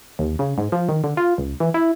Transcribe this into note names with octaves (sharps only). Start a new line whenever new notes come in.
D#2
C#3
G#2
F3
D#3
D3
F4
C#2
E3
E4